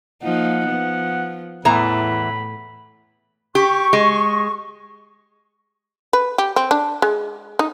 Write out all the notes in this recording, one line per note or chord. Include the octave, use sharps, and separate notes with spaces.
F3 A#3 D#4 F#5
F3 B3
E2 A2 E3 A#5 B5
G4 C#6
G#3
B4
G4
C4
D4
G#3
D#4